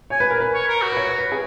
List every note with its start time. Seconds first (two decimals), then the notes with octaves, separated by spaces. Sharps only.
0.10 C#5 G#5
0.20 B4
0.30 A#4
0.40 B4
0.54 C#5
0.68 A#4
0.82 F#4
0.92 B4
0.97 C#5
1.18 B4
1.32 G#4